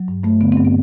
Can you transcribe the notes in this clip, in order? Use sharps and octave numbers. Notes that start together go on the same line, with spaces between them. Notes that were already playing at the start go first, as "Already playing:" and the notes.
Already playing: F#3
G2
G2 A3
D3 B3
G2 C4
B3